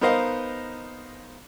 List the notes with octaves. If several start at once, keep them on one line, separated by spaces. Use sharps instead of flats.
B3 D#4 A#4 C5 D#5 F5